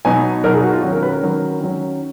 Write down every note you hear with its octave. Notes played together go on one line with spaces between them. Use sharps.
B2 F#3 B3 D#4 G#5
B2 F#3 B3 D#4 A#4
G#4
F#4
F4
D#3 F#3 C#4 F#4
A#4
B4
A#4
D#3 F#3 C#4
D#3 F#3 C#4